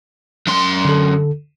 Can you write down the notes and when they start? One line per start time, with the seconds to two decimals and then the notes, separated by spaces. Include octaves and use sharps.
0.48 F#2 C6
0.85 D3 A4